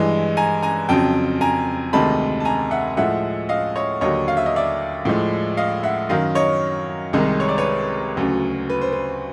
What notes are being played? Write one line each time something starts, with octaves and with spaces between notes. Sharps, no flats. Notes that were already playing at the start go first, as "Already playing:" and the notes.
Already playing: G2 E3 G#3
G#5 A#5
G#5 A#5
F2 C#3 F#3 G5 A5
G#5 A#5
D2 C3 D#3 G#3 A5 B5
A5
G#5 A#5
E5 F#5
A2 F3 G#3 E5 F#5
D#5 F5
C#5 D#5
D#2 D3 F#3 C#5 D#5
F5
E5
D#5
D5 E5
A2 F3 G#3
D#5 F5
E5 F#5
F#2 D#3 F#3 D#5 F5
C#5 D#5
C2 C3 D#3 G#3
C#5
D5
B4 C#5
D2 C#3 F#3
B4
C5
B4